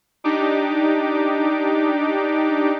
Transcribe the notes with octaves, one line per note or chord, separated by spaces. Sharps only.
D4 D#4 G4 D6